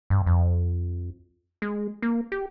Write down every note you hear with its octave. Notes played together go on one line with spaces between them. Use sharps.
G2
F2
G#3
A#3
G4